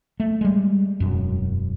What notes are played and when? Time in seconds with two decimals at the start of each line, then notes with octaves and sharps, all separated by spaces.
0.20 A3
0.41 G3 G#3
1.00 E1 F#2